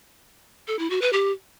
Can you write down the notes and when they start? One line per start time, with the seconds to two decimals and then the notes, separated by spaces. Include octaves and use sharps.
0.68 A4
0.79 E4
0.90 F#4
1.02 B4
1.13 G4